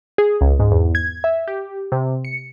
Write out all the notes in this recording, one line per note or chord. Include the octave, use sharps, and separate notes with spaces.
G#4
C#2
G#2
E2
G#6
E5
G4
C3
C#7